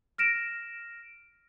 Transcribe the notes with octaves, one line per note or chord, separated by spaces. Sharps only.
F6 A#6 D7 E7